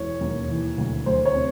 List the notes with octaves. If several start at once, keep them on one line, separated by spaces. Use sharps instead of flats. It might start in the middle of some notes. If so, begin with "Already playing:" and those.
Already playing: E1 E3 C#5
D#2
E3
D2
D2 C5
C#5
C3